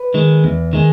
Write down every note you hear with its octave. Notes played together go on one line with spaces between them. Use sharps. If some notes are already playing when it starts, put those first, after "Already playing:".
Already playing: B4
D#3 G#3
E2
D#3 G#3